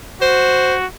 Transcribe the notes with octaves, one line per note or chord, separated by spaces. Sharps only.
F#4 C5